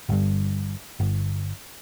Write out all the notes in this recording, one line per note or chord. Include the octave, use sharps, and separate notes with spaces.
G1 G2
G1